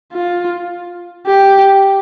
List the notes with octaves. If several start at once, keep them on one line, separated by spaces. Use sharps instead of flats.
F4
G4